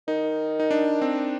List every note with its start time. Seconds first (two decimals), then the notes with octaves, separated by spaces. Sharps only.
0.08 D#3 D#4
0.60 D#4
0.71 D4
1.02 C4